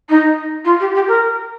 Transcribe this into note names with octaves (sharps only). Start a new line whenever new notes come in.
D#4
F4
G4
G4
A#4